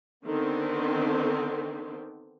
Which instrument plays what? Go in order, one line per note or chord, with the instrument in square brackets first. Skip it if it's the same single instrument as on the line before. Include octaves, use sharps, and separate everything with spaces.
[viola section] D3 D#3 B3 C4